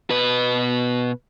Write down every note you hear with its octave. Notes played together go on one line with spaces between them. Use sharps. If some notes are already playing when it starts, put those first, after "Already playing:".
B2 B4